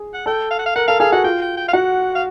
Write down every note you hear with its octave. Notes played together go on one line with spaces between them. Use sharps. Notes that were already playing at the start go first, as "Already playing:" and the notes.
Already playing: G#4
F#5
A4 G5
F5
F#5
F5
A#4 F#5
A4 F5
G#4 F5
F#4 F#5
F4 G5
G5
G5
F5
F#4 F#5
F5